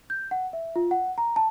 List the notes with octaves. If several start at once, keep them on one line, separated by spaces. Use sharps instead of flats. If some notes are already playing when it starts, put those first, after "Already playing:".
G6
F#5
E5
F4
F#5
A#5
A5